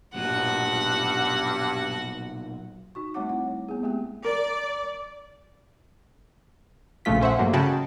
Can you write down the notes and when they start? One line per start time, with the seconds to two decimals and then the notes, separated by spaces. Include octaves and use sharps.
0.15 B1 G2 A#2 F#4 F#5
2.95 D#4 F#4 C#6
3.14 G3 A3 C4 C#5 F#5 D6
3.29 E4 F#5
3.48 C#5
3.69 B3 C4 G#4
3.83 G#3 A3 B3 G4 G5
4.24 A#4 D5
7.05 A#1 A#2 C#3 A3 F4 B6
7.21 C#4 C5 E5 F#5
7.39 G2 F#3 A3 A#3
7.53 C#3 F#4 D#5 G5 A5 B5